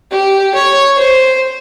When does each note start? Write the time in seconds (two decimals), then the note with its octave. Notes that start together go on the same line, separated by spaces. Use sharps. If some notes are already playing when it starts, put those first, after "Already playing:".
0.11 G4
0.55 C#5
0.99 C5